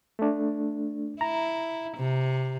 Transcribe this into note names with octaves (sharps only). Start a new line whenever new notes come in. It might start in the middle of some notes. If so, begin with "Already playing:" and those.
A3 D4
E4 A#5
C3